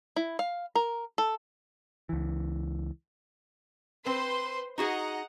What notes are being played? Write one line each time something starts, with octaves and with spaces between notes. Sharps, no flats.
E4
F5
A#4
A4
C#2 E3
C4 B4 C5 C6
D#4 F#4 G#4 D#5 F#5 A#5